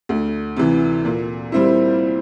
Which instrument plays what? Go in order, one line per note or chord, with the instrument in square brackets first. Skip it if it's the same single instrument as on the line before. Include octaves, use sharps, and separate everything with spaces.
[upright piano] D2
C3 E3
A#2
G3 C4 E4